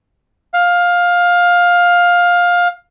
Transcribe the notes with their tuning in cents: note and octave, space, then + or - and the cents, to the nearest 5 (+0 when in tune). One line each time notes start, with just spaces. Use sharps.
F5 +15